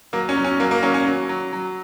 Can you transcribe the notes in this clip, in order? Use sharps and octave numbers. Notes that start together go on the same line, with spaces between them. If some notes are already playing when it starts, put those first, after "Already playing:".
F#3 A#3
C#4
F#3
C#4
F#3 A#3
A#3
F#3 C#4
C#4
F#3
F#3
F#3